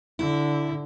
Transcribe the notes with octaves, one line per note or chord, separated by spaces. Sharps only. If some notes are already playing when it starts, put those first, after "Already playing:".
D3 E4